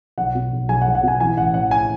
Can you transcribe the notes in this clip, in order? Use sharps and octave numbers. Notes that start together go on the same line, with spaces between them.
B1 F#5
B2
B1
B1 G#5
F#5
B1
F#5
B2 G#5
E3 G#5
A1 F#5
A1 F#5
G#5